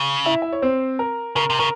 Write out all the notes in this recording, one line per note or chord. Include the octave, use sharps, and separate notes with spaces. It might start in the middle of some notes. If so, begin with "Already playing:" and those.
Already playing: C#3
E4 E5
E5
C#5
C4 C5
A#4
C#3 A#4
C3
C#3 A#4